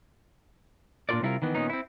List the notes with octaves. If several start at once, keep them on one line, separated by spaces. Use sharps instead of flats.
A#2 D4 F4 F#4 A#4 D5
C3 G3 D4 E4 F4 A#4
D#3 E3 B3
A#2 D#3 B3 C#4 D#4
C4 E4